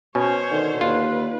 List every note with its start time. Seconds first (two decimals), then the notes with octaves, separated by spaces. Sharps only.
0.15 B2 C#4 C5 C#5
0.51 D3 D#3
0.81 D#2 F4 B4